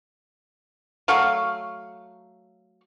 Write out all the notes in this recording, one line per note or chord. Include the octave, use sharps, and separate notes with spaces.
F#3 A3 F5 C#6